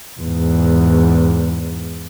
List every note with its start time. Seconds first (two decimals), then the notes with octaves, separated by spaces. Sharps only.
0.21 E2 G#2